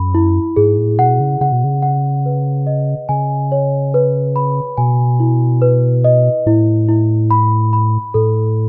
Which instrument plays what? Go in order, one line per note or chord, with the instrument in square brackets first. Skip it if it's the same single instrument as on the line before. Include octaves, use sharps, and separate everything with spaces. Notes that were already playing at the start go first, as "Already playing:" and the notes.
Already playing: [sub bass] F#2 [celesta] B5
[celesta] E4
[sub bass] G#2 [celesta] G#4
[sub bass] A2
[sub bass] B2 [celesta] F#5
[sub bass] C#3
[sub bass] C#3 [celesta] F#5
[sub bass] B2
C#3
[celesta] F#5
B4
D#5
[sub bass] C#3 [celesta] G#5
[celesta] C#5
B4
B5
[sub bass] B2 [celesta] G#5
[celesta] E4
B4
D#5
[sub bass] A2 [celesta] E4
[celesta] E4
B5
B5
[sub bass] A2 [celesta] A4